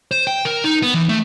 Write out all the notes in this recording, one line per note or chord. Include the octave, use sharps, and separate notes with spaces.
C5
G5
A#4
D#4
B3
E3
A3